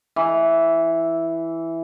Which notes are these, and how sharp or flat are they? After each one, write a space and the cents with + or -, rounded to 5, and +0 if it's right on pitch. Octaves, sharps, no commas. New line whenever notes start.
E3 +0